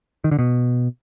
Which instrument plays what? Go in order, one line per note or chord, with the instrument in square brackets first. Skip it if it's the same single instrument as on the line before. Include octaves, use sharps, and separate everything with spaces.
[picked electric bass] D#3
D3
B2